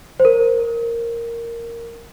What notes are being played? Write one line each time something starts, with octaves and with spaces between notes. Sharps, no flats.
C5
A#4